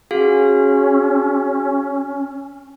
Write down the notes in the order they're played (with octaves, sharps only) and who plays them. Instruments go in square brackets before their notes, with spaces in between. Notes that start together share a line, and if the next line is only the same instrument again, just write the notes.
[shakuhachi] C#4 [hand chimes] F#4 G#4 F5